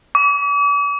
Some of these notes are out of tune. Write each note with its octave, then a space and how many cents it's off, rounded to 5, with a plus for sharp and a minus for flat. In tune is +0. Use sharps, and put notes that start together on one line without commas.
D6 -40